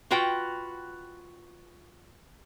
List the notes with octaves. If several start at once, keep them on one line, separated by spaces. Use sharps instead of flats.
F4 F#4 B4 G5